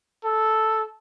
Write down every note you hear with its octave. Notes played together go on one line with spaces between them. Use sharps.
A4